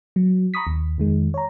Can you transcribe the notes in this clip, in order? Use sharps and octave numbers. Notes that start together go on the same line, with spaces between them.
F#3
A#5 B5 C#6 D#6 B6
D#2
F2 D#3 G#3
C#5 A#5